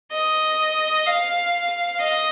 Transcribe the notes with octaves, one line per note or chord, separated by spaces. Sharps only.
D#5
F5
D#5